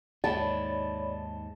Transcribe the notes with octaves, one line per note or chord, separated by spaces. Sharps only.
D#2 G#2 C#5 D5 A5 B5